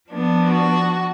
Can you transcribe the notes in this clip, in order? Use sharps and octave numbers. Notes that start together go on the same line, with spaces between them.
F3 B3 D4
F#4